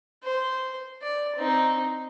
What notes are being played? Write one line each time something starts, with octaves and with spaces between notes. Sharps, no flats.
C5
D5
C4 D#4